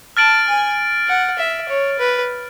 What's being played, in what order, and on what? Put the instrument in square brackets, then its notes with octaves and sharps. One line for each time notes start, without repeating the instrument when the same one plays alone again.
[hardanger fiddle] A5 [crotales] F6 A6 D7 F#7
[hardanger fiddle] G#5
F#5
E5
C#5
B4